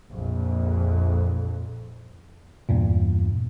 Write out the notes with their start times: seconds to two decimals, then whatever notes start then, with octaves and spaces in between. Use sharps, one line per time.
0.11 A#1 F2
2.69 E2 G2 A#2